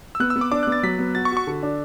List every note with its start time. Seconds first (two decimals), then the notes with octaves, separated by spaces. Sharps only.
0.15 E6
0.20 B3 F#6
0.30 E6
0.36 B3
0.41 D6
0.51 D4 D6
0.63 B3 F#6
0.72 A6
0.83 F#3 B6
0.99 B3
1.15 F#4 A6
1.25 C#6
1.32 F#4
1.37 C#6
1.47 D3
1.63 D4